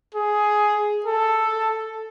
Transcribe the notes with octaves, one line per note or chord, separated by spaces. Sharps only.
G#4
A4